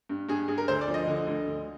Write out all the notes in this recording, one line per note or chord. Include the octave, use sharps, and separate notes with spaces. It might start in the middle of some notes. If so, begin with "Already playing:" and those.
G2
G2 G#4
G2 G#4
A#4
D2 C5
D5
F3
D#5
D3
D2
D2